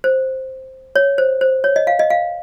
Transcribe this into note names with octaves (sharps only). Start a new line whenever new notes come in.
C5
C#5
C5
C5
C#5
D#5
F5
D#5
F5